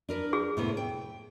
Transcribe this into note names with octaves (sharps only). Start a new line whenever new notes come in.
D4 A#4 B4
G#4
A2 C3 B3
G5